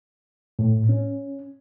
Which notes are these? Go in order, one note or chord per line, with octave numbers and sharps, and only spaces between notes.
A2
C#4